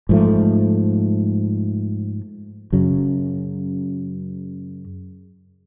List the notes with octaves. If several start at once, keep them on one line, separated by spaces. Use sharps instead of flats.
G#2 F3 A3
F#2 C#3 F#3